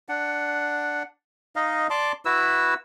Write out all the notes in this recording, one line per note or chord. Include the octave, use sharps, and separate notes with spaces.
D4 F#5
D#4 D#5 F5
D5 A5 C6 D6
E4 F#4 B4 E6